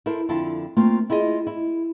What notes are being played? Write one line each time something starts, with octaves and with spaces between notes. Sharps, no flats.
E4 A4 A#4 C5
F2 D3 E4 F4 A5
A3 A#3 C4 F4
E4 F4 G#4 D#5
E4